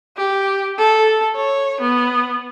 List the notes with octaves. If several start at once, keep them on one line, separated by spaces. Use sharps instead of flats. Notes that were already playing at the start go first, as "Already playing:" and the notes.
G4
A4
C#5
B3